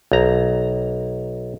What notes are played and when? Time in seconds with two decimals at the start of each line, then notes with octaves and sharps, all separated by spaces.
0.12 B1 A#5